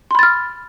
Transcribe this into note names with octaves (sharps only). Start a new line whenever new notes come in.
B5 C6 F6 A6